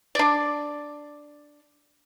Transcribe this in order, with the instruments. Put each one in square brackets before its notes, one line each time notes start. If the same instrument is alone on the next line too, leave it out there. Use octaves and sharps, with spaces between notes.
[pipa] D4 D5